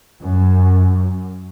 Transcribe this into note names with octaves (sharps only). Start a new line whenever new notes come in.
F#2